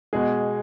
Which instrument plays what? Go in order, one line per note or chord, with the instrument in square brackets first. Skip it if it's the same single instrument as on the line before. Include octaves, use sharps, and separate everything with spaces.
[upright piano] B2 G#3 G#4